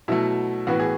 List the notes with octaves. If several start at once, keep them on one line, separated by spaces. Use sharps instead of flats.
B2 F#3 A3 E4
A2 E3 B3 F#4
G#4